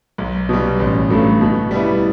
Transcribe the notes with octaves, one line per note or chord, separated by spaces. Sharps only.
B1
B2 G3
A1
G2 F#3 A3
B2
G3 B3 E4